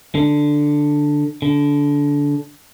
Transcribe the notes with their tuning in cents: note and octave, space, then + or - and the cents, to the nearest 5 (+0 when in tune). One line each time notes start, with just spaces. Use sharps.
D3 +5
D3 -20